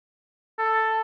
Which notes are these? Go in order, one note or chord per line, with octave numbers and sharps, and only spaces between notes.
A4